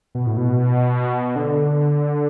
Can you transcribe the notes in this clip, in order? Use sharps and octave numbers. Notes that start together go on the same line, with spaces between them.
B2
A2
B2
D3